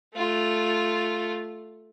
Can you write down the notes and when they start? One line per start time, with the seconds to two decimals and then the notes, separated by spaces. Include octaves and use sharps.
0.15 A3 F4